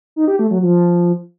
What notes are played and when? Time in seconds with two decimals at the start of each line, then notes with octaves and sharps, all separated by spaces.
0.16 D#4
0.28 G4
0.39 A3
0.51 F#3
0.62 F3